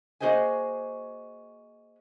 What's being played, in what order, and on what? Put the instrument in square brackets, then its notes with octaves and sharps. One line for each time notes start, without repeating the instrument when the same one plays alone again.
[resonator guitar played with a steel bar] A#3 F#4 G#4 C5 D#5 G#5